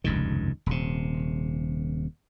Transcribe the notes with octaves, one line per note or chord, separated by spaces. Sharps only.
F1 C#2 G2 D#3
D#1 C3